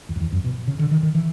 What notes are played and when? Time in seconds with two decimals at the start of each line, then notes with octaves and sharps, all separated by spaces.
0.09 E2
0.16 F2
0.20 E2
0.32 F#2
0.44 B2
0.67 C#3
0.79 D3
0.91 D#3
1.03 D#3
1.15 E3